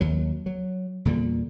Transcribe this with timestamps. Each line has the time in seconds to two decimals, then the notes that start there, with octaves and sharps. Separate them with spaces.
0.01 D#2 F#3
0.46 F#3
1.05 E2 A#2 D3 G3